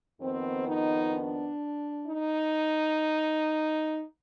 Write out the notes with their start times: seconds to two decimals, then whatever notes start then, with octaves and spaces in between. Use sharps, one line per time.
0.20 F2 D#3 B3 C4
0.67 D#4
1.14 D4
2.06 D#4